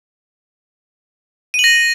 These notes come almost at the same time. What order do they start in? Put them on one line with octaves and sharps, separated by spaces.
D#7 F#7 A#6